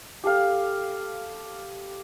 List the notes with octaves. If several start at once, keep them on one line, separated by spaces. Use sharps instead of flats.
G4 A4 F5